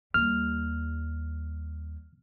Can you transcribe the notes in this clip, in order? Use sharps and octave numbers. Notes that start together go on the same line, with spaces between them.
D#2 G3 F6